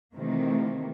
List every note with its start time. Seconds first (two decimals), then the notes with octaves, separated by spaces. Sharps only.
0.16 C3 D#3 E3 A3 A#3 C4